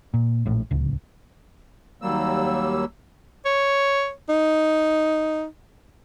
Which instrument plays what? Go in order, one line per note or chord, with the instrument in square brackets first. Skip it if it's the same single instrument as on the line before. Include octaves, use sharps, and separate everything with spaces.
[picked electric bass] A#2
A#1 A2
D1 C#2
[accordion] D#2 F#3 G3 A#3 E6
[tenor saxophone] C#5
D#4